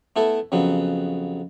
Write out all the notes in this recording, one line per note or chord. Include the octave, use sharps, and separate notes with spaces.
A3 B3 E4 A4
F2 C#3 F#3 B3